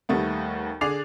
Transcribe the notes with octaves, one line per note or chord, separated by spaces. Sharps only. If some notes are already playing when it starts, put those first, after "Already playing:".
D#2 G3 A3 B3
D3 G#4 D5 D6 C7 F7